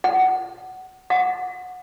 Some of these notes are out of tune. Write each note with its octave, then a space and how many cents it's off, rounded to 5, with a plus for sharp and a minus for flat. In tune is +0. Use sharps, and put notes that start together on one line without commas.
F#5 +15
F#5 -20